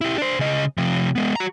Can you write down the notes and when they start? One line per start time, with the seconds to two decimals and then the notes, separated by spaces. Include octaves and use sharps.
0.01 E4 G4
0.18 D4 C5
0.39 C#3 D#5
0.78 C3 F3
1.15 G#3 B3
1.36 F#4 A#5